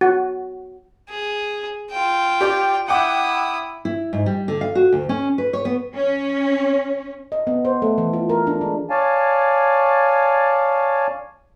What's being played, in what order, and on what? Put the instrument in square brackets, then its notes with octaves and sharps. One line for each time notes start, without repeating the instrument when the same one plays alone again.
[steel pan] F#4
[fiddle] G#4
F4 G5
[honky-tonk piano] G4 D5 D6
[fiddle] E4 D#6 [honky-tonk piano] F#5 G5 D6
[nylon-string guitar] E4
G#2
G3
D3
F5
F#4
D2
C#4
B4
C#5
B3
[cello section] C#4
[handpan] D#5
B3
C5
A3
E3
F4
A#4
D4
G#3
[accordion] C#5 D5 F5 G#5 A5